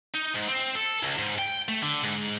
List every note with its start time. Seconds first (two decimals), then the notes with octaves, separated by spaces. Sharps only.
0.15 D#4
0.35 G#2
0.48 C4
0.75 A4
1.03 C#2
1.19 G#2
1.39 G5
1.68 A3
1.83 D3
2.03 G#2